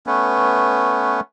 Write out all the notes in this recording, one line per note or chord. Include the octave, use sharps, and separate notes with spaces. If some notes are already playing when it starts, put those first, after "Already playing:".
A3 B3 C#4 B4